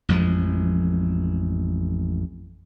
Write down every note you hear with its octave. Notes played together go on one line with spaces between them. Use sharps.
A1 F2 F3 G#3